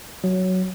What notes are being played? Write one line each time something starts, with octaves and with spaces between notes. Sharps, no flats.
F#3